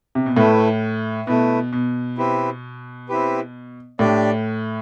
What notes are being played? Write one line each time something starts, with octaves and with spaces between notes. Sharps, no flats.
C3
B2
A2 A3 E4 B4
B2 A3 E4 B4
B2
C4 E4 G4 B4
C4 E4 G4 B4
A2 D4 G4 D5